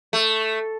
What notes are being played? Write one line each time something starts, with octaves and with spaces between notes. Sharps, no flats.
A3